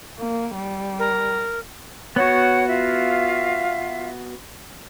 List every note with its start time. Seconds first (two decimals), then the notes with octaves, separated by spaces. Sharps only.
0.19 A#3
0.55 G3
0.99 A#4
2.16 B3 F#4 C#5 F#5
2.68 F4 E5 F5